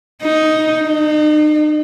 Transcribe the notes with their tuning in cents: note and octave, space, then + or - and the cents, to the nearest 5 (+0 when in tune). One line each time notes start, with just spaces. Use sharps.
D#4 +10
D#4 -40